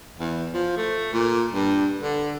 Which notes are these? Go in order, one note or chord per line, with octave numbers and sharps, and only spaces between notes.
E2
F3
A3
A#2
G2
D3